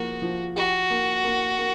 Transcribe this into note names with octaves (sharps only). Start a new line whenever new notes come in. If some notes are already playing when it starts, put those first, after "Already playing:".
Already playing: F3 A#3 F#4
F3
F#4 G4
A#3
A#3
A#3